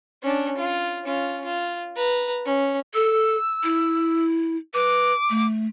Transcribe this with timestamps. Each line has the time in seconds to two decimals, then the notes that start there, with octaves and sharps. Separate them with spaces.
0.23 C#4 D4
0.58 F4
1.03 C#4 F4
1.45 F4
1.96 B4 A#5
2.46 C#4
2.94 A4 E6
3.64 E4
4.74 B4 D6
5.30 A3